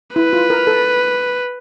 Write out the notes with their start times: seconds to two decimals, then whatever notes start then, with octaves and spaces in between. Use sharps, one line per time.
0.16 E4 B4
0.33 F4
0.50 A#4
0.67 A4